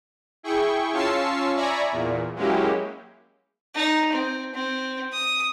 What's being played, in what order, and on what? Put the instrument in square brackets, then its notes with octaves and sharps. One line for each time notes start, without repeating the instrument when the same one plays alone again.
[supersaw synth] E4 G#4 G5 C#6
C#4 F4 A5 C#6 E6 C7
D5 E5 G#5 A#5 B5 C#6
E2 A#2
F#3 G#3 A#3 C#4 E4 G4
[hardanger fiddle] D#4
C4
C4
D#6